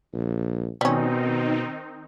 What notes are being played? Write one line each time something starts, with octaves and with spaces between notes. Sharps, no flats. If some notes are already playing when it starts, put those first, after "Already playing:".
A#1
B2 D#3 G3 C4 C#4 D#4